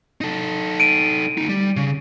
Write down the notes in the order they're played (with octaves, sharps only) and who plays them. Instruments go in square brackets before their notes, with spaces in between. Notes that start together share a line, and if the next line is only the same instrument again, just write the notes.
[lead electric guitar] D#4 A4
[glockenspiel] D7 D#7
[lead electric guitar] D2 D#4
G3
C#3